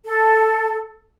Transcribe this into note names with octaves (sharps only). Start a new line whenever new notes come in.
A4